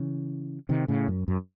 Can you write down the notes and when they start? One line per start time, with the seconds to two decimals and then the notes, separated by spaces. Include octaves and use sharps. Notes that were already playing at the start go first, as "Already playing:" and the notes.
Already playing: C#3 E3
0.69 C3 D#3
0.88 A2 C#3
1.08 F#2
1.28 F#2